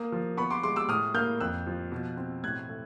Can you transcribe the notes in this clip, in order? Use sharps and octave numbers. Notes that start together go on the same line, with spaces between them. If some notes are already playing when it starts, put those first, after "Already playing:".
Already playing: A#3 D#6
F3
B3 B5 C#6
C6 D6
G#3 C6 D6
D6 E6
A2 D#6 F6
A#3 F6 G6
F2 E6 F#6
F3
B2
C4
A2 F#6 G#6
A3